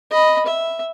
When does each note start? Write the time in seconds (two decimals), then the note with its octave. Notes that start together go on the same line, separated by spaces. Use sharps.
0.11 D#5 B5
0.46 E5